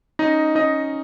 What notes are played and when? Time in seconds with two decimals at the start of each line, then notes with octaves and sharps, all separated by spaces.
0.19 C#4 D#4 D#5
0.55 C#4 D#4 D#5